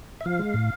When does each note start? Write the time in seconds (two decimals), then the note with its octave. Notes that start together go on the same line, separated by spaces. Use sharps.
0.21 E5
0.26 F3 F5
0.39 G#3
0.54 A2